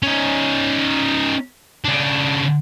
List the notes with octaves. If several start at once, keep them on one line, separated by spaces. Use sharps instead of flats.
C#4 D#4
C#3 D4